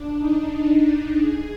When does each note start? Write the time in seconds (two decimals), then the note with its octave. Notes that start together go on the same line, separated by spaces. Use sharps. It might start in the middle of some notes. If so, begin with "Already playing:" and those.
Already playing: D4
0.18 D#4
1.18 G#4